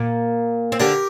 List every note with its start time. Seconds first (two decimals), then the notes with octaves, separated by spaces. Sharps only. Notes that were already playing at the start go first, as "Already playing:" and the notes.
Already playing: A#2 A#3
0.72 C4
0.79 D3 D4 G4 A#4